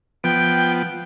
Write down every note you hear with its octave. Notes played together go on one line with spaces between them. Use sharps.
F3 B3 G5